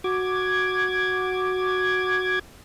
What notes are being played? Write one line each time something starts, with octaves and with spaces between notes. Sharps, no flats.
F#4 D6 G#6